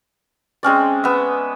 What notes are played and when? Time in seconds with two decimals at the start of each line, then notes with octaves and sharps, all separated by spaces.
0.63 G#3 C4 C#4 D5
1.04 B3 E5